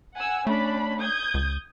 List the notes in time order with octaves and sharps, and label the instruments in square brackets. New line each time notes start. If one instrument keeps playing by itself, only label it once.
[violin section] F#5 G#5 E6
[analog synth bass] A3 [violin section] C#4 D4 B5
[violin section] D#6 G6 G#6
[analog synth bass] C#2